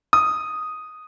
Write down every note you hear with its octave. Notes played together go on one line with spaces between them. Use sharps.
D#6